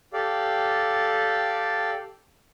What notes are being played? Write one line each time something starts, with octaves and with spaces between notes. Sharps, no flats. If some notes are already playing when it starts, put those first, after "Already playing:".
G4 A4 D5 F5